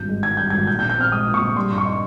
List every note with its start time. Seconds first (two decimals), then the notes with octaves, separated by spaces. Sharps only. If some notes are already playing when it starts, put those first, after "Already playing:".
Already playing: G#1 G2 G6
0.09 G#3
0.23 D#3 G#6
0.37 G2 G6
0.50 G#1 G#6
0.67 A#2 G6
0.79 G6
0.82 A#1
0.90 G6
0.98 C4 F6
1.12 G#3 D#6
1.27 A#2
1.34 C#6
1.42 A#1
1.56 G3 C6
1.71 G2
1.78 C#6
1.85 D#4